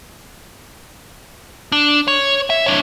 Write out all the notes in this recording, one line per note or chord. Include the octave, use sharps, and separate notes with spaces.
D4
C#5
E5
D4 C#5